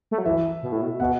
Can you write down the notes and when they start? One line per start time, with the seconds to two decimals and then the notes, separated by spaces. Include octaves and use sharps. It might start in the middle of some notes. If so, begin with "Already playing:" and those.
0.11 A3
0.18 F#3
0.26 E3 E5
0.63 B2
0.72 A2
0.82 B2
1.00 B2 F#5